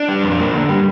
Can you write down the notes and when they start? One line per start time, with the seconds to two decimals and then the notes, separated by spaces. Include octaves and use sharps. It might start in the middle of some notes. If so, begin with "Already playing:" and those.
Already playing: D4
0.08 G3
0.23 F2
0.39 A#3
0.54 D3
0.69 G3